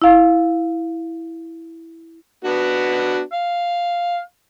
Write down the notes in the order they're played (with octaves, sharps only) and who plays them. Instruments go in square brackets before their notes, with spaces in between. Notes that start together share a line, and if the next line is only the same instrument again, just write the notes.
[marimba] E4 F5
[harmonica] B3 D4 F#4
F5